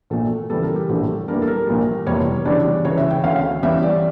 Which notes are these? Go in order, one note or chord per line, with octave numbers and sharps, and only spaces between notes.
A#1 A#2 A3 A4
E2 C#3 E3 G3 A4
A#4
G4
A#1 A2 G3 D4 A4
E2 E3 G3 A#3 D4 A#4
A4
A#4
A#1 A#2 G3
F1 E2 E3 G3 A#3 C#5
E2 C#3 E3 G3 D4 D5
C#2 C#3 E3 C#5
E5
G5
D2 D3 A3 C#4 F5
E2 E3 G3 C#4 E5
D5